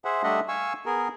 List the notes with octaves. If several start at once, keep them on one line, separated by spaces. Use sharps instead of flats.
G#4 C5 E5 F#5
G3 A3 D4 D#5 E5 F#5
F5 G#5 C#6 E6
B3 G#4 A#4